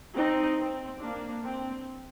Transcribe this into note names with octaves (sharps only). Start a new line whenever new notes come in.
C4 D#4
C4
A#3 D4
C4